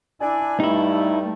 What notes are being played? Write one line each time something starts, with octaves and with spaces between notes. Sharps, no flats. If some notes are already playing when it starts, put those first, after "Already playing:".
D4 E4 D5 G#5
G2 G3 A3 D#4 E4